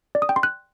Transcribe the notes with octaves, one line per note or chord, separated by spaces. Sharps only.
D5
D#6
G5
C6
F#6